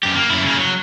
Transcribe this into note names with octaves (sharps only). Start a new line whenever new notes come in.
F#2 G4
A#3
F#2 E4
C#3 A#3
F#3